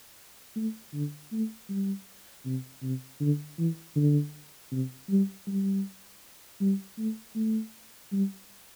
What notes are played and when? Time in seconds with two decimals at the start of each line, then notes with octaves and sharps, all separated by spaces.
0.56 A3
0.93 D3
1.32 A3
1.69 G3
2.45 C3
2.83 C3
3.20 D3
3.58 E3
3.96 D3
4.72 C3
5.09 G3
5.47 G3
6.61 G3
6.98 A3
7.35 A3
8.12 G3